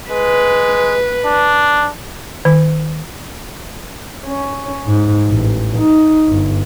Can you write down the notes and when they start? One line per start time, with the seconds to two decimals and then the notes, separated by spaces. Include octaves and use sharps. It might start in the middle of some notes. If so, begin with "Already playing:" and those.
0.11 G#3 B4
1.25 D4
2.45 D#3
4.25 C#4
4.87 G#2
5.28 A1
5.77 D#4
6.28 G1